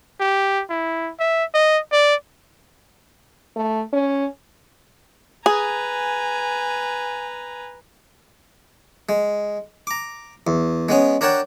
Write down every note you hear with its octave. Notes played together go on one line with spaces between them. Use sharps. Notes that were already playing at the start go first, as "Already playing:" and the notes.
G4
E4
E5
D#5
D5
A3
C#4
G#4 B4 G#5 A#5
G#3
A#5 D6
E2
G#3 B3 C#4
D4 A#4 C#5 F#5 G5 A5